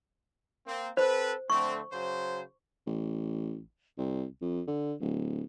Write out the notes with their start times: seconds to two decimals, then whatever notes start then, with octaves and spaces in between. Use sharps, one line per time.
0.67 A#3 C4
0.97 C4 A4 B4 C5
1.50 D3 A3 C4 C#6
1.92 C#3 F#3 C5
2.87 A1
3.98 C2
4.42 F2
4.68 D3
5.00 D1